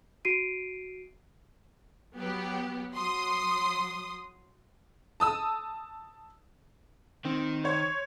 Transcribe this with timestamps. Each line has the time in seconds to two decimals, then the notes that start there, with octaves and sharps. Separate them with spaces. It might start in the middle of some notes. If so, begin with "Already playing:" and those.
0.25 F#4 C7 D7 D#7
2.18 F#3 B3 G4
2.94 F#3 C6 D#6
5.20 A5 D#6 E6
7.25 D#3 C4
7.64 C5 C#5